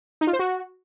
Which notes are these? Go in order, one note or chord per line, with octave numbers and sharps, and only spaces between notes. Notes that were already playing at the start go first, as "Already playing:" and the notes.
D#4
F4
C5
F#4